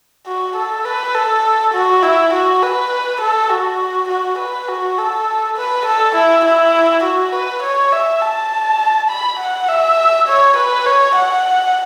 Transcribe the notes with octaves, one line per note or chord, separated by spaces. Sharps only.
F#4
A4
B4
A4
F#4
E4
F#4
B4
A4
F#4
F#4
B4
F#4
A4
B4
A4
E4
E4
F#4
B4
C#5
E5
A5
B5
F#5
E5
C#5
B4
C#5
F#5